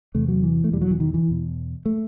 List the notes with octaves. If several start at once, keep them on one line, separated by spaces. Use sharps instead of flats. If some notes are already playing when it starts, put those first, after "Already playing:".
E2 C3 A3
F#3
E3
A3
E2 B2 G3
F#3
E3
D#3
E3
E2 B2
A3